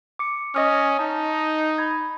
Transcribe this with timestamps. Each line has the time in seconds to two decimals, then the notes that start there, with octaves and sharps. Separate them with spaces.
0.19 D6 C#7
0.55 C#4 D#5 D#6 F6
0.99 D#4 A5
1.78 B5 G#6